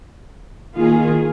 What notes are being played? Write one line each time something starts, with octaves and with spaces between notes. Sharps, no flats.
D#3 A#3 F4 G#4